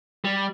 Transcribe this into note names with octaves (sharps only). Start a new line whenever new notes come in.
G3